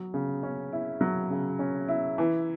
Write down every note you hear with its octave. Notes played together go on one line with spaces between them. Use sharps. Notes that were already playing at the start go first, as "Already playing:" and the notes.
Already playing: F#3
C#3
C#4
E4
F#3
C#3
C#4
E4
E3